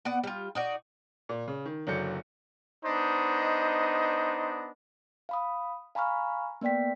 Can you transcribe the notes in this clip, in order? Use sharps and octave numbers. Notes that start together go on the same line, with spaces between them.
B3 D5 F#5
G3 F4
D#4 F#4 D5
A#2
C#3
D#3
F#1 D3 F#3 D5 G6 C#7
B3 D4 D#4 C5 D#5
F5 B5 D#6
F5 G#5 A#5 B5 C#6 F6
A#3 B3 D5 G5 B6